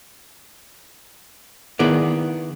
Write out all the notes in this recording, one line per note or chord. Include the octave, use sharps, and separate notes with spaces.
D#3 B3 E4 G#4 D5